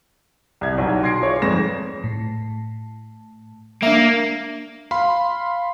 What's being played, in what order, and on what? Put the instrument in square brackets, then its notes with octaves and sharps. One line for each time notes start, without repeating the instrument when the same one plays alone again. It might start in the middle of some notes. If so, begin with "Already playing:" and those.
[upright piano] C2 G#6
B1
C6 G#6 A#6 C7 D7
F4 G#4 C#5 D5
F2 G#2 B4 A#6 E7
[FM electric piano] A2
[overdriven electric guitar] A#3 [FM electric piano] D4 E5
[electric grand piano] F5 B5 C6